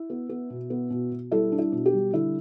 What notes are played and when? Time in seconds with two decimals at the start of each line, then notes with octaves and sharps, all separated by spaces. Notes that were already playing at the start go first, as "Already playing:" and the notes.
Already playing: E4
0.10 B3
0.29 B3
0.50 B2
0.70 B3
0.90 B2
1.12 B2
1.32 G3 E4 A4
1.52 D4
1.59 E4
1.72 B2
1.86 G4
1.93 G3
2.13 D3 E4